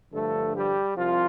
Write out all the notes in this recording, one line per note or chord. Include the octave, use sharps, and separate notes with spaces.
G2 D3 F3 A3 A4
G3 G4
C2 C3 F3 F4